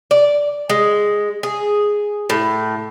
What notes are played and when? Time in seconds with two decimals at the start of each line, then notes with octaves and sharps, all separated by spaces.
0.11 D5
0.70 G#3
1.43 G#4
2.30 A2